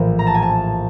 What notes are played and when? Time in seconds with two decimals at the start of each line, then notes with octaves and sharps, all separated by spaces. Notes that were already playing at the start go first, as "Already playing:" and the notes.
Already playing: A#1 A2 E3
0.19 A#5
0.27 A5
0.34 G#5
0.42 A5